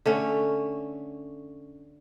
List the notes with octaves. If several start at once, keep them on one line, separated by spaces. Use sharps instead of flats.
D3 A3 C#4